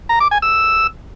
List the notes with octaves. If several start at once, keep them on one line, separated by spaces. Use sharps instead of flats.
A#5
D6
G#5
E6